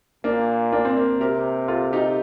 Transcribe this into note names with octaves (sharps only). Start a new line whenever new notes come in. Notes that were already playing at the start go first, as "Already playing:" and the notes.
A#2 A#3 D4
A#3 D4
C4
A#3
C3 G4 A#4
F4 A4
D#4 G4